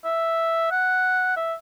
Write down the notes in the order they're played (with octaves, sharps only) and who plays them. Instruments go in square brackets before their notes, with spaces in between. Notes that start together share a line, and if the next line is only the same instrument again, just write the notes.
[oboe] E5
F#5
E5